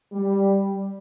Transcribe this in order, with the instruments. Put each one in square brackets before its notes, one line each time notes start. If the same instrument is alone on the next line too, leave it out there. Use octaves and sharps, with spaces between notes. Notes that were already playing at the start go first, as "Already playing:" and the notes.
[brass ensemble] G3